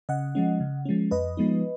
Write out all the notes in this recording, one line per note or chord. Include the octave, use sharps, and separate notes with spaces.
C#3 D#5 F#5
F3 G#3 C#4
C#3
F3 G#3 C#4
F2 B4 D#5
F3 G#3 B3 D#4